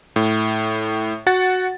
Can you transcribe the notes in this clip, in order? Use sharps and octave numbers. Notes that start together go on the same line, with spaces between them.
A2
F#4 F#5 A6